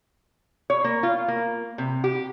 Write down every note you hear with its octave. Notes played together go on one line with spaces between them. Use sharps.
C#5
A#3
F4
A#3
C3
G4